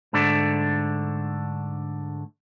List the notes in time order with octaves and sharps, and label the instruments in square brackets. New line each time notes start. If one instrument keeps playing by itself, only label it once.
[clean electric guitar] G#2 D3 A3 D4